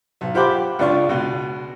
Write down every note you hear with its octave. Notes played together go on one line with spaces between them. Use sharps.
B1
F4 G4 C5 F#5 B5 D6
C#2 D4 F4 C#6
C#2 B2